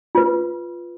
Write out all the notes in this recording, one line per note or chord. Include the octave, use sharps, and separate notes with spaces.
F4 B4